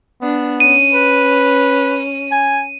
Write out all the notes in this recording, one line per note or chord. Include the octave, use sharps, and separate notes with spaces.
B3 D4
C#4 D#7
B4
G#5